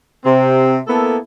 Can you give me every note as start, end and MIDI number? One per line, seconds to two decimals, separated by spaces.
0.25 0.79 48
0.25 0.79 60
0.87 1.18 58
0.87 1.18 59
0.87 1.18 64
0.87 1.18 69